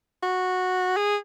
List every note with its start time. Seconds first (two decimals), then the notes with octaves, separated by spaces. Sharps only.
0.23 F#4
0.97 G#4